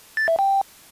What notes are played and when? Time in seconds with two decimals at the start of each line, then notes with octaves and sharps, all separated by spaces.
0.17 A6
0.28 E5
0.39 G5